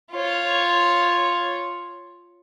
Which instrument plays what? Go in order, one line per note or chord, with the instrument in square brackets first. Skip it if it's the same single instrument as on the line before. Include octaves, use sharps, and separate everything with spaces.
[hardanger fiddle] F4 C#5